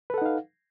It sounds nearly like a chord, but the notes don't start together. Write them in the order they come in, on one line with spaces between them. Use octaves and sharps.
B4 A4 F#5 D#4 F5